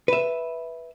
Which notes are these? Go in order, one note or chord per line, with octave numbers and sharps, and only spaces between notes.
B4 E5